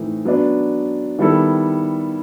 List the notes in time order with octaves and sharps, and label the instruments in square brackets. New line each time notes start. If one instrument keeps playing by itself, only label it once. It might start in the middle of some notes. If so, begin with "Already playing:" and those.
Already playing: [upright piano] A2 E3 A3 C4 D#4
F#3 B3 D4
D#3 G3 B3 E4 A4